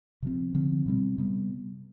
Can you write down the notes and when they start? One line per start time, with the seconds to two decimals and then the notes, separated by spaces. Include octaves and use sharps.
0.22 C3 F3 C4
0.54 D3 F3 C4
0.86 B2 G3 C4
1.18 C3 G3 B3